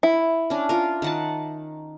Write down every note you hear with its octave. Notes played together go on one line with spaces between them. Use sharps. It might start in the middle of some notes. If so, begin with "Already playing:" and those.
E4
C#4 D4
F4 A#4
D#3 F#5 A5